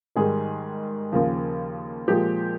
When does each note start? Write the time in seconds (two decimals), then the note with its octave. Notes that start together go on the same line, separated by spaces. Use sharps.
0.16 G#2 D#3 G3 G#4
1.12 D#2 C#3 F3 A#3
2.08 A#2 F3 G#3 G4